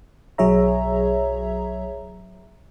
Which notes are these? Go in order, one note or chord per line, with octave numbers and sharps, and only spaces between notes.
B1 F#3 G#4 C#5 E5 A#5